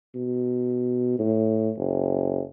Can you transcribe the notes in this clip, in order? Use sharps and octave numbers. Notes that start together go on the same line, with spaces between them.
B2
A2
F#1